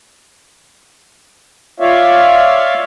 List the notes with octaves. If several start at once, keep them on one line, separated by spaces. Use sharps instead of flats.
F4 C#5 D5 E5 F5